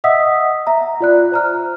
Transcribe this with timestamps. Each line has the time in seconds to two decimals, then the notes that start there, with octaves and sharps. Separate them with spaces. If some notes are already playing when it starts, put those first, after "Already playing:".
0.04 D#5 E5 F#5 D#6 E6 B6
0.67 E5 A#5
1.00 F4 D5 F#6
1.32 C5 A#5 F6